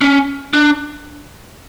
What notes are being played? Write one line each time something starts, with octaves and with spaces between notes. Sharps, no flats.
C#4
D4